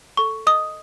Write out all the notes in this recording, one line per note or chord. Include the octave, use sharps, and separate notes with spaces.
A4 C#6
D#5 D#6